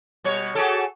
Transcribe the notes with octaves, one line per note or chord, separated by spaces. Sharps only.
B2 G3 C#5
F#4 G#4 A4